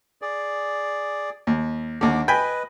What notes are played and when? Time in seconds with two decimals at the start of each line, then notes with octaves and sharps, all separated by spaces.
0.22 G#4 D5
1.47 D#2
2.01 D#2 D3 D6
2.28 B4 D#5 G5 G#5 B5